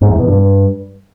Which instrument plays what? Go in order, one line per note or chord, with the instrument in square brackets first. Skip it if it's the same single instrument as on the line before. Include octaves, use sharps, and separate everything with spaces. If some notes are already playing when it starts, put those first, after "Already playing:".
[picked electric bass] G#2
E2
B2
G2